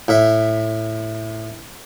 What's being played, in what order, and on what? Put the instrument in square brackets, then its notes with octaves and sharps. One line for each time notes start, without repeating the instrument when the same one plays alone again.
[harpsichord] A2 E5